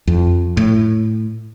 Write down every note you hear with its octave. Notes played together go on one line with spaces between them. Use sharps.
F2
A2